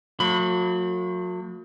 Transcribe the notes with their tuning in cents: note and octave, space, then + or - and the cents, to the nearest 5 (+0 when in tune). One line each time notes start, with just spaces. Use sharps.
F#3 -40 A3 +45 B5 +10